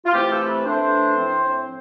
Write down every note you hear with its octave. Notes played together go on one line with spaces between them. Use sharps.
F4
C3 E3 A3 C4 G4
A4
B4
E3 A3 D4 C5
A2 F3 C4